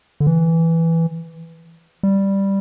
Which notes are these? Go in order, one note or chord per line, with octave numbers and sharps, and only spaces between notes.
D3
E3
G3